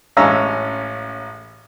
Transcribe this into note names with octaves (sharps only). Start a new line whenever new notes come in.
A1 G#3 C#4 F5 A#5 E6